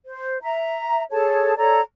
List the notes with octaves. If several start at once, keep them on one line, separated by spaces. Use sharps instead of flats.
C5
E5 A#5
G#4 A4 C#5 A5
A4 C#5 D5 A#5